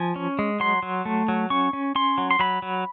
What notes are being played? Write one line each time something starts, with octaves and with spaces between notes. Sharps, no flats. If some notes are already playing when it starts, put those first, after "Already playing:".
Already playing: F3 G#5
C#4
G#3
F#3 C6
F#3
A3
F#3
C#4 C#6
C#4
C#4 C6
F#3
C6
F#3 B5
F#3